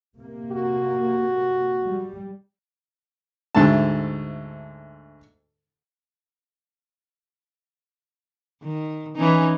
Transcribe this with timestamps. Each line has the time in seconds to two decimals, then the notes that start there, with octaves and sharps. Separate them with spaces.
0.17 C3 A#3
0.52 F#4
1.84 G3
3.55 D2 G#2 A3 A5
8.63 D#3
9.16 E3 C#4 D#4